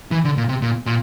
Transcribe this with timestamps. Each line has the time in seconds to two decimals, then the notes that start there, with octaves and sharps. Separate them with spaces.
0.11 E3
0.25 D3
0.37 A#2
0.49 C3
0.62 A#2
0.86 A#2